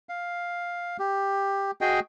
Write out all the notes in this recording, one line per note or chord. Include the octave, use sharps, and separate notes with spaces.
F5
G4
F#4 G#4 D#5 G5